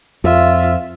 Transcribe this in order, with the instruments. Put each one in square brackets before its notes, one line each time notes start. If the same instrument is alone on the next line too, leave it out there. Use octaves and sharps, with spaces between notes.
[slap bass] F2 [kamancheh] F4 E5